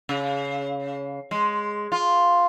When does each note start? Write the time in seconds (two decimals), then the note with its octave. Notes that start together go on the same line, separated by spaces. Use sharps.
0.09 C#3
1.31 G#3
1.92 F4